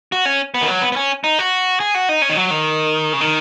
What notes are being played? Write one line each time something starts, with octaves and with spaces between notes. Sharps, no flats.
F#4
C#4
B3
D#3
F#3
B3
B3
C#4
D#4
F#4
G#4
F#4
D#4
C#4
D#3
F#3
D#3
C#3
D#3